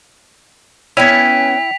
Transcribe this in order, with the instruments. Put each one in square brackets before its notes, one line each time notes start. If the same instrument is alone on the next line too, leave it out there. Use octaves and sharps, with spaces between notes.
[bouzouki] B3 C#4 [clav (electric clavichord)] E4 [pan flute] G5 [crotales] B6 F7